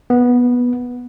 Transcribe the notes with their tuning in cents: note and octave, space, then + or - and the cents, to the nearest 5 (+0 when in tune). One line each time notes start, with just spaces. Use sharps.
B3 -10